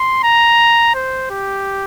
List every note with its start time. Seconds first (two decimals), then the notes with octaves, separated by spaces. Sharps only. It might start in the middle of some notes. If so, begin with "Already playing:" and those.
Already playing: C6
0.24 A#5
0.95 C5
1.30 G4